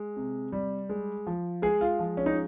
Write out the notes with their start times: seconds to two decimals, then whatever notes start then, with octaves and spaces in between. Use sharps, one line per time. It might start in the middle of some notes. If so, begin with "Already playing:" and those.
Already playing: G#3
0.17 C3
0.52 G3
0.89 G#3
1.27 F3
1.62 G#3 G#4
1.81 F4
1.99 F3
2.17 C#4
2.26 D#4